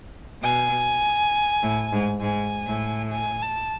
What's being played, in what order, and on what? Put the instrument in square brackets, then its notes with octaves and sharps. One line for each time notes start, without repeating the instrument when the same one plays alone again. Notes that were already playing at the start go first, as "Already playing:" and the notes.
[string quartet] B2 [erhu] G#5
[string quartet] A2
G#2
[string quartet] G#2 [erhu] G#5
[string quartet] A2
[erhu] G#5
A5